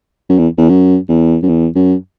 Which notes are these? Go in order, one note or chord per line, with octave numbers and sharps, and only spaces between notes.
F#2
E2
E2
F#2
E2
F#2
E2
F#2